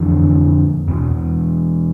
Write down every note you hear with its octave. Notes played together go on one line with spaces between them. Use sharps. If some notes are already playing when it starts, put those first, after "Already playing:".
Already playing: F2 D3 E3
E2 B2